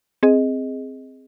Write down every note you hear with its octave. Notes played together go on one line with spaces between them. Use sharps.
C4 G#4 D#5